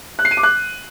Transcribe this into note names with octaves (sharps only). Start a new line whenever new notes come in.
F#6
C7
D#7
D6
F#6